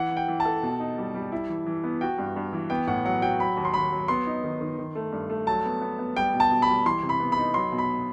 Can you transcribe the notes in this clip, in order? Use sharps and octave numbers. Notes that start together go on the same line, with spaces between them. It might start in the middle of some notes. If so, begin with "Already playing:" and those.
Already playing: E3 F#5
E3
G5
E3
A5
A4
B2
D#4
G3
G3
E4
E3
E3
B3
F#4 G5
G2
G2
E3
B3 G5
A2 F#5
F#3 F#5
F#4 G5
F#3 B5
D#2
C6
D#2 B5
F#3
B3 C6
D#4
D#3
D#3
D#3
A3
G2
A3
F#3 A5
B3
B3
B3
G3 G5
B2
A5
B2
B5
G3
E3 C6
C3
B5
B3
B5
D#4
F#3 C6
B2
B5